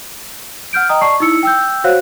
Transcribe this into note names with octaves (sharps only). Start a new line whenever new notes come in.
F#5 F6 G6 D7
D#5 G5 A#5 D#6
D5 A5 C#6 C7
D#4 E4 E6 C#7
G5 E6 G6
F#4 C5 C#5 F5 F#5 F#6